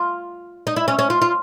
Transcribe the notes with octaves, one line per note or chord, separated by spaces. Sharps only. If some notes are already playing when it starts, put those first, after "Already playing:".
Already playing: F4
D#4
E4
C#4
C#4
F4
F4